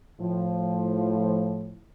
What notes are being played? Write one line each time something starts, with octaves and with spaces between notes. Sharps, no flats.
A2 F3